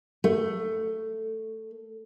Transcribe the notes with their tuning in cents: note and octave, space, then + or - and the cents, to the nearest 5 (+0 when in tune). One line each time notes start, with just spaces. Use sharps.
A3 +10